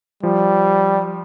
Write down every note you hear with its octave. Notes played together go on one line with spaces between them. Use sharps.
F3 G3